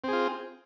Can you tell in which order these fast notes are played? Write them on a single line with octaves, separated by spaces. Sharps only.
C4 G#4 F4